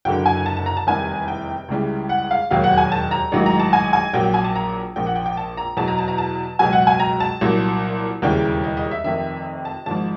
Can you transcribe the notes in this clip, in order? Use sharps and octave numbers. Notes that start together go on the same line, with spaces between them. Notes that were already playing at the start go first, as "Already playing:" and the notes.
F#1 F#2 D3 G5
G#5
A5
A5
A#5
A5
F1 E2 C3 D#3 G3 G#5
G5
C#2 C#3 E3 G3
F#5
F5
E1 D#2 D#3 F#3 F5
F#5
G#5
A5
A#5
A1 G#2 D#3 F#3
A#5
A5
G#5
G#5
A#1 A#2 F#3 G5
G5
G#5
A5
A#5
A#1 A#2 F3 G5
F#5
G5
G5
A5
A#5
E2 B2 F#3 A5
A#5
A5
A#5
A5
C#2 B2 F#3 G#5
F#5
G#5
A#5
A5
C2 A#2 F#3
E1 D#2 C#3 E3 G3 G5
D#5
D#5
E5
F1 F2 C3 D#3 E5
A5
G#1 G#2 F3 A5